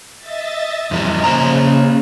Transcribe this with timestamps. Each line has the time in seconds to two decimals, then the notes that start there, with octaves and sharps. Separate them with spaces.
0.19 D#5 E5 A6
0.91 F2 E3 G3 D#5 G#5
1.24 C#3 A#3 C5 A#5